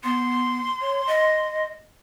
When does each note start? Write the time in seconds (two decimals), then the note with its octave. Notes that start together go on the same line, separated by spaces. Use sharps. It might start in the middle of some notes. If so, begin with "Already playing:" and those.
0.04 B3 C6
0.81 C#5
1.07 D#5